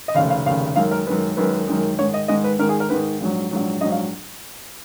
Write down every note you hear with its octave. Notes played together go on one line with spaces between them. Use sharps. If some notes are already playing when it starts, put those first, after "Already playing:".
D#5
F1 D#2 C#3 F5
F5
F1 D#2 C#3 F5
F#2 D#3 G#3 F5
A#4
F#2 D#3 G#3 B4
F#2 D#3 G#3 B4
F#2 D#3 G#3
G#2 D#3 G#3 C#5
D#5
G#2 D#3 G#3 D#5
B4
G#2 D#3 G#3 A#4
G#4
A#4
G#2 D#3 G#3 B4
A#1 G#2 F#3
A#1 G#2 F#3
A#1 G#2 F#3 D#5
F5